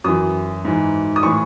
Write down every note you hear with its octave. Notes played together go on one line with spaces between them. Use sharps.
F#2 E3 D#6
G#2 E3
D#6
A2 E3 C#6